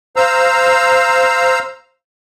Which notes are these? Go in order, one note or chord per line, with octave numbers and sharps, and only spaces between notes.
C5 F5 A#5 E6